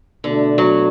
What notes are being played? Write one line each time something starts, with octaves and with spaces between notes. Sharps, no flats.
B2 D3 A3 D4
F#3